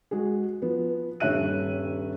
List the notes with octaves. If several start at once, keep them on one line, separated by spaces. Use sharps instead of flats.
G#3 F#4 G#4
F3 B3
D#1 G2 C#5 E5 F#6 D#7